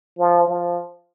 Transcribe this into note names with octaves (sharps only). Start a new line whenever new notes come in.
F3
F3